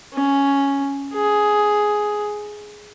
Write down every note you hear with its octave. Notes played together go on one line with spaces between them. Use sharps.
C#4
G#4